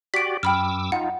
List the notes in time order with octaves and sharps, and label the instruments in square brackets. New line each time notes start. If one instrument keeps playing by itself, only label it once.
[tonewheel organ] F#4 G4 D5 [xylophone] B6 D7
[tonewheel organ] F#2 D6 E6 [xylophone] G5 B5 F6
[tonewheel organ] D#4 F4 [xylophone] F#5